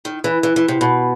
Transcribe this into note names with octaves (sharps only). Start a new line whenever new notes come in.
D#3
E3
E3
E3
C3
B2